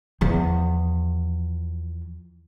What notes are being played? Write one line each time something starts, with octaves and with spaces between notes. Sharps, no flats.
E2 F3